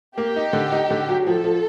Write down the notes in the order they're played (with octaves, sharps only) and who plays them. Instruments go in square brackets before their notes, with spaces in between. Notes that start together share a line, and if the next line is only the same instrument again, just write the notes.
[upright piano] A#3 [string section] G4
[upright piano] D#4
D3
D#4
D3
F#3
[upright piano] F3 [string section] A4
[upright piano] F3